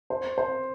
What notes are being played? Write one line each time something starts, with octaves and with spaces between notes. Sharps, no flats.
C5
C5